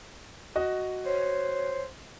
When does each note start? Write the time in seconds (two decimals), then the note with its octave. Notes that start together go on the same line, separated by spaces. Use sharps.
0.56 F#4 D#5
1.05 C5 C#5